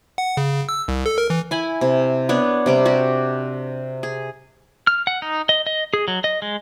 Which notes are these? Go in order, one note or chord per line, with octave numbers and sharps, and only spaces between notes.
F#5
C#3
E6
C2
A4
A#4
E3
E4 G#5 B5
C3
B3 D4 C#5
C3 G3 D6
F#4 G4
G#4
F6
F#5
D#4
D#5
D#5
G#4
F#3
D#5
G#3